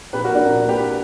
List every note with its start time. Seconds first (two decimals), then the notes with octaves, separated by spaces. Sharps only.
0.13 A#1 G4 B4
0.24 F#4 A#4
0.30 A#2
0.35 D4 F#4
0.47 A#1
0.63 A#2
0.68 G4 B4